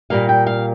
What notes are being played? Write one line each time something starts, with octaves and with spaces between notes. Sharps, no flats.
A#2 G3 A#3 F5
G5
F5